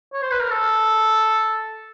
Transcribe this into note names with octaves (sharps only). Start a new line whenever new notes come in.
C#5
C5
B4
A#4
A4